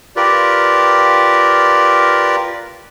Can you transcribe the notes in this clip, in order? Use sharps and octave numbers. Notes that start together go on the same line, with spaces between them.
F4 G4 A#4 B4 D5